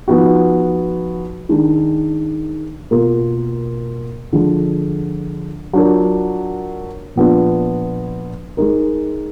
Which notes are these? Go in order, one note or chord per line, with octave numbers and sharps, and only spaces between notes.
F3 B3 D#4 F#4
D#3 G#3 D4
B2 A#3 F4 A#4
D3 F3 G#3
F#3 D4 F4 A#4
A#2 F3 B3 D4 F4
G#3 D#4 A#4